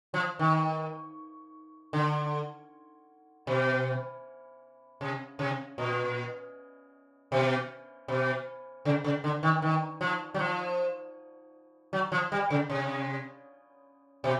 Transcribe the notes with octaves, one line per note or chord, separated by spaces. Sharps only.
F3
D#3
D3
B2
C3
C3
A#2
B2
B2
C#3
C#3
D3
D#3
D#3
F3
F#3
F3
F#3
F3
G3
C#3
C3
B2